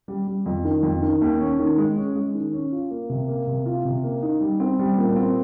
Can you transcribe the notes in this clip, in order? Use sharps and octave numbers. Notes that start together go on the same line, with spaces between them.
G3
G3
F2
D#3
F2
D#3
D#2
C#4
D#3
G#3
C#4
G#3
D#3
C#4
F4
A#3
C3
A#3
C3
F4
C3
A#3
D#4
G3
C4
G3
A#2
C4